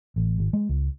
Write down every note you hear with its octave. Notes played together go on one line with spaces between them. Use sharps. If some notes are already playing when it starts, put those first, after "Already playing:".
A1
G#1
G#3
C#2